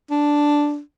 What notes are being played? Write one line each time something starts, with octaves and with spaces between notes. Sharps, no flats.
D4